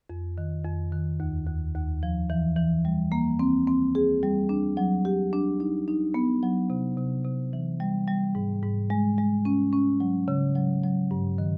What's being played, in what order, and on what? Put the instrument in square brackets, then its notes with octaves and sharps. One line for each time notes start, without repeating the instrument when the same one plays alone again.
[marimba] F2
D#3
F2
D#3
D#2
D#2
D#2
F3
E3
E3
G3
A#3
C4
C4
G#4
G3
D4
F#3
G4
D4
D#4
D#4
B3
F#3
C3
C3
C3
E3
G3
G3
G#2
G#2
G#3
G#3
C#4
C#4
F#3
C#3
F#3
F#3
G2
D#3